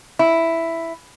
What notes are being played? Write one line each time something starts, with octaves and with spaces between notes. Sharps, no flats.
E4